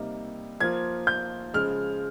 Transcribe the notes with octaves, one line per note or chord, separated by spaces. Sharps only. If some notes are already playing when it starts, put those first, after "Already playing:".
Already playing: C3 G3 A#3 D#4
F3 A#3 F4 G#6
G6
C#3 F3 G#3 F6